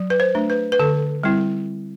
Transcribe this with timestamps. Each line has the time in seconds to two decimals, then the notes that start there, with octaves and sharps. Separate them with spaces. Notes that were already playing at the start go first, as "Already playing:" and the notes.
Already playing: F#3
0.10 B4
0.20 C5
0.35 A3 D4
0.50 B4
0.72 B4
0.79 D3 A4
1.23 G3 C4 E4